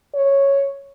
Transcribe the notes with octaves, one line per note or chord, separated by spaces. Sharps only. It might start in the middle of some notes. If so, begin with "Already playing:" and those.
C#5